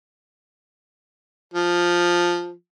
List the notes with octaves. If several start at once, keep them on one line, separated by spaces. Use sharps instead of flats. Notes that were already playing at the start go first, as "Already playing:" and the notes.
F3